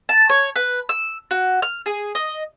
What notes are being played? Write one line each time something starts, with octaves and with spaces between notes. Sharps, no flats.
A5
C#5
B4
E6
F#4
F6
G#4
D#5